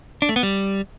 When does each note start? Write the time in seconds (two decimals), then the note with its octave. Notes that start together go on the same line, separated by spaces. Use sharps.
0.22 D4
0.29 A3
0.36 B3
0.43 G3